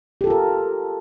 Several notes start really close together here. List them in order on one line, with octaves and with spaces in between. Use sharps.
G4 A4 F4 A#4